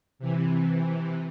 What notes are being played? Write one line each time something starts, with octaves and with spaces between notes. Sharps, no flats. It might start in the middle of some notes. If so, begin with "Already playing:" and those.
C3 E3